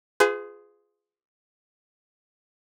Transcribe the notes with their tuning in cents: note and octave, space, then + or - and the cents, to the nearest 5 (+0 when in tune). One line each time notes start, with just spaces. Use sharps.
F4 +0 G#4 +0 B4 +45